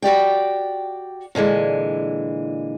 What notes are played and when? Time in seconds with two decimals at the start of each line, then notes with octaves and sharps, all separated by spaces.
0.02 F#4 G4 D5 G5
1.35 A#2 D3 E3 G#3